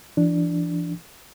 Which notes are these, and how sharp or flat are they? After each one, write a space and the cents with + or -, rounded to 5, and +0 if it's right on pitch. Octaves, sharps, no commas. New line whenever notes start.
E3 +45 D4 +0